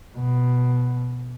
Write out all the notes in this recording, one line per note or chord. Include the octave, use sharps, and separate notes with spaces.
B2